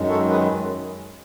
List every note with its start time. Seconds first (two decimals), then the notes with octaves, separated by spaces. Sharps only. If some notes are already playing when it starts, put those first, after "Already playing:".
Already playing: F#2 D#3 G#3
0.09 A4 C#5
0.30 G#4 B4